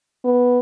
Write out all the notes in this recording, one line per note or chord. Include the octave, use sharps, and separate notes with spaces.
B3